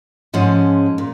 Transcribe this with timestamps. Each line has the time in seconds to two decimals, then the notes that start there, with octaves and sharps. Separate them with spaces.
0.34 G#2 F3 G#3 C#4
0.98 A#2